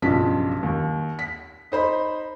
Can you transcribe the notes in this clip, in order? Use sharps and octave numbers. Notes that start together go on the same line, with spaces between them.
B1 G2 C#3 F3 A5 B6
D#2
B6
D#4 C5 B5